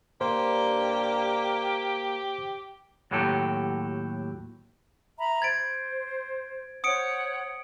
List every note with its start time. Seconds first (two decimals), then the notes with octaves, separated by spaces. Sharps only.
0.21 G2 A#3 G4 C5 D5
3.11 D#2 A2 F#3 G4 A4
5.18 E5 A#5 B5
5.42 C5 G#6 A6 D7
6.84 C5 C#5 F#5 D#6 C#7 D7